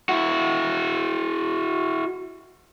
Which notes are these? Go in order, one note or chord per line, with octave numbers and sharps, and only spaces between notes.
E4 F#4